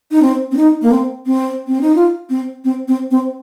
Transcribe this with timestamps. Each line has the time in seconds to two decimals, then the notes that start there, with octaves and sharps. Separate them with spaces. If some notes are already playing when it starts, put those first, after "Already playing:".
0.11 D#4
0.22 C4
0.52 C4
0.57 D#4
0.82 A#3
0.92 C4
1.26 C4
1.67 C4
1.81 D#4
1.96 F4
2.30 C4
2.65 C4
2.88 C4
3.11 C4